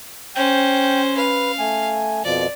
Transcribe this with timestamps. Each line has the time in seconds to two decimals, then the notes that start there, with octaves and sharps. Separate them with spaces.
0.36 C#4 C5 G5 G6
1.17 B4 F5
1.59 A3 G#5
2.24 F2 B2 F3 D5